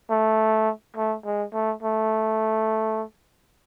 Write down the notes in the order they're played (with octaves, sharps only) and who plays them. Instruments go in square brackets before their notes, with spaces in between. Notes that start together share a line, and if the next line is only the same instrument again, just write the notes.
[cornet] A3
A3
G#3
A3
A3